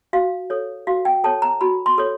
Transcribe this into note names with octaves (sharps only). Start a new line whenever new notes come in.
F#4 F5
A4 C#5
F#4 F5
G5
A4 C#5 A5
A#5
F#4 B5
C6
A4 C#5